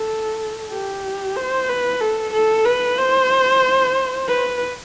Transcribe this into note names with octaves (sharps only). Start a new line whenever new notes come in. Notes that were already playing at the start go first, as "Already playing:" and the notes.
Already playing: A4
G4
C5
B4
A4
A4
B4
C5
B4